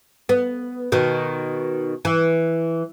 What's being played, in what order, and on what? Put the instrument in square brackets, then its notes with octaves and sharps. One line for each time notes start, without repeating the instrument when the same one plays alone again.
[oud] B3
B2 D#3
E3